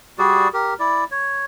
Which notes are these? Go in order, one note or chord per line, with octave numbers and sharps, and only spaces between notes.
G3 F#4 G#4 D5
G4 A#4
E4 D5
C#5